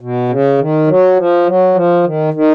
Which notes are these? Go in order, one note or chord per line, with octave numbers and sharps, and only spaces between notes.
B2
C#3
D#3
F#3
F3
F#3
F3
D#3
D#3